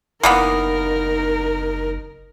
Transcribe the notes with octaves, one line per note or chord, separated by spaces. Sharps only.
F#1 E3 A#3 B3 D#4 A#4